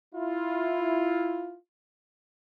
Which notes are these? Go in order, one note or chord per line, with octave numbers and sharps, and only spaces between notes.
E4 F4